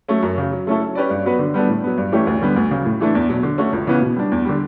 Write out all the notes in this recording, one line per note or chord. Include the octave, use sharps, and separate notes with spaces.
F#3 A3 C#4
F#2
C#3 F#3
F#3
A3 C#4 E4 A4
F#3
C#4 G4 B4 D5
G2
F#3 B3 F#4 B4
D3
G3 B3 D4 A4
A2
F#3 B3
G2
E3 A3 C#4 G4
D2
D3 G3 B3
D2
C#3 F#3
A2
E3 A3 D4
E2
B2 F#3
D3
A3 C#4 F#4 C#5
C#2
C#3 E3 B3
B2
G3 D4
E2
D3 G3